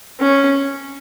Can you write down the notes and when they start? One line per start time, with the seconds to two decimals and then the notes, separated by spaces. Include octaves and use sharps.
0.20 C#4